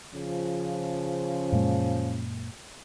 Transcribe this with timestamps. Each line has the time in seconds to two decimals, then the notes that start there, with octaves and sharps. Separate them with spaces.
0.14 C#3 F3
1.52 F#2 A#2 G#3